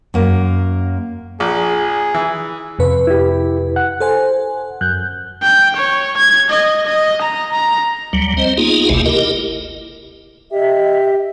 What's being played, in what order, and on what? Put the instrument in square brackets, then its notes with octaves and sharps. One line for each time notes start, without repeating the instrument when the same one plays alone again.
[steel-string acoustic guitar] F#2 A#3
[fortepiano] A#1 [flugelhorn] G#4
[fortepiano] E3
[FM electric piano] F2 C3 B4
[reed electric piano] E4 G4
[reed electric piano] F#5 [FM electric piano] F#6
[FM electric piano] A4 C5 G#5
[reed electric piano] F#2 [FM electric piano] F#6 G6
[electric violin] G5
C#5
G#6
D#5
D#5
A#5
A#5
[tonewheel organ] D2 F#3 G3
C4 C5 D#5
A#3 B3 D#4 F4 G#4
G#1 D2 C3 A3 A#3 E4
E4 G4 A#4 D#5
[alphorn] G4 [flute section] D#5 E5